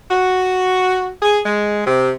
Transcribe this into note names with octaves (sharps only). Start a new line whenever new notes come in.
F#4
G#4
G#3
C3